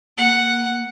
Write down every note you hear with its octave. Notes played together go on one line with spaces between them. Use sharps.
A#3 F#5